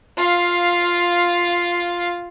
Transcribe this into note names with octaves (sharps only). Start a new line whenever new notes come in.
F4 F5